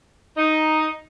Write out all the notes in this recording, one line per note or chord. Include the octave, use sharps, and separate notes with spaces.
D#4